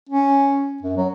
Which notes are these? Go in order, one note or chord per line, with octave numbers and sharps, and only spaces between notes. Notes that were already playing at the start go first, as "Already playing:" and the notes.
C#4
F#2
F#3